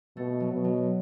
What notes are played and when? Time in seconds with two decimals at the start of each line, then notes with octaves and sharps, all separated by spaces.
0.17 B2 A3
0.40 F#3
0.53 B2
0.64 F#3